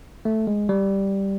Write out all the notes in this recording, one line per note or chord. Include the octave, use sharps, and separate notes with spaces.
A3
G#3
G3